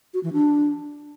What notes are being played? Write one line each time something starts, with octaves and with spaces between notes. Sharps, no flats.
F#4
E3
D4